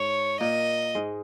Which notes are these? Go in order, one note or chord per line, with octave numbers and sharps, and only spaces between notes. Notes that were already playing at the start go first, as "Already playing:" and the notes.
Already playing: G#2 C#5
A#2 A#3 D#5
G#2 G#3